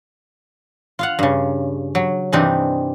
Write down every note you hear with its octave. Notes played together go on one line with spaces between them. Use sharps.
F4 F5 F#5
G2 C#3
F#3
G2 C3 E3 C4 D4 D#4